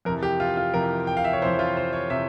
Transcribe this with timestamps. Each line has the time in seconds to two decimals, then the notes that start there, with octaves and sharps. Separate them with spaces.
0.05 F2 C3 E3 A#4
0.23 G4
0.40 F4
0.57 F4
0.74 F2 C3 E3 A#4
1.07 G5
1.17 F5
1.24 E5
1.33 C#5
1.42 F2 C3 E3 C5
1.59 F4
1.77 C5
1.93 C#5
2.10 C3 E3 E5